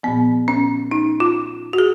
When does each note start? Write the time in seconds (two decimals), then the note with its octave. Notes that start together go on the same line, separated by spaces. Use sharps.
0.03 A#2 F3 B3
0.48 C#4
0.91 D#4
1.20 F4
1.73 F#4
1.78 G#4